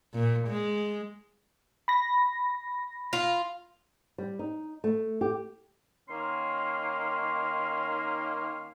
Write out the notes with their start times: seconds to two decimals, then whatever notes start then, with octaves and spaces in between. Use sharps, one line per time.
0.14 A#2
0.48 G#3
1.88 B5 A#6
3.13 F4
4.18 G3
4.39 D#4
4.84 A3
5.21 G4
6.09 D#3 A#3 C#4 C6